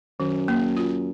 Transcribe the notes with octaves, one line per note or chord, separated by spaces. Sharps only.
F#2 D#3
A#3
F4